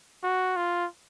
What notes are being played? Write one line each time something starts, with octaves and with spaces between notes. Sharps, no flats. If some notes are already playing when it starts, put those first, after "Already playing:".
F#4
F4